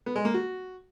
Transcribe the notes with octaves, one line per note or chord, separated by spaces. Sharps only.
B3
G#3
A#3
F#4